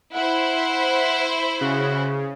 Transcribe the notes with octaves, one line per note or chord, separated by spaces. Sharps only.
E4 C5 F#5
C#3 F#4